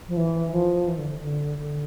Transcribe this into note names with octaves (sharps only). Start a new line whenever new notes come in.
F3
E3
F3
E3
D3
D3
D3